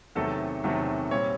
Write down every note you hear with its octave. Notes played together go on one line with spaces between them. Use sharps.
E2 C3 D#3 F#3 A3 A4
E2 C3 D#3 F#3 A3
A#2 G3 C4 C#5